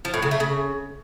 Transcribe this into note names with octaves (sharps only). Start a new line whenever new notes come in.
F3
A2
C#3
A3
C#3